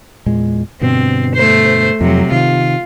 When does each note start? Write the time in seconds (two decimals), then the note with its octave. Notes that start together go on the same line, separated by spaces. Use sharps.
0.26 E2 A#2 G#3
0.81 G2 B2 D3 C4
1.35 A3 C5
2.01 F2 C3 F#3
2.32 C3 D#3 F4